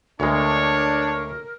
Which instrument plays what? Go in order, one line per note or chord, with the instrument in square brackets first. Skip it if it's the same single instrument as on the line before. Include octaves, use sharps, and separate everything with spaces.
[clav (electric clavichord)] D2 G#3 [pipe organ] D4 [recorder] A#4 [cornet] C#5